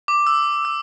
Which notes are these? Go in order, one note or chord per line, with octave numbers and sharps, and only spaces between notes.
D6
E6
E6